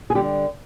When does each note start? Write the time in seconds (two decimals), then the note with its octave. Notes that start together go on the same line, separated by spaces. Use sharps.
0.10 G#4
0.15 D3 G3 G4